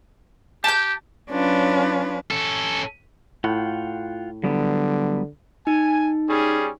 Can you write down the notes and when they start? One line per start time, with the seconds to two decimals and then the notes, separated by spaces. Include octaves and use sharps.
0.64 G4 A5 G6
1.31 F#3 C#4 D4 F4 B4
2.31 C#4 A4
3.44 A2 F4 F#5 G5
4.44 D3 F#3 G3 B3
5.67 D#4 G#5
6.29 G3 C#4 G#4